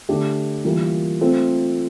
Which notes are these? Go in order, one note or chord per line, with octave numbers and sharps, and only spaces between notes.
D3 A3 D4 G4
E3 G3 A#3 F4 A#4
A3 C4 F4 A4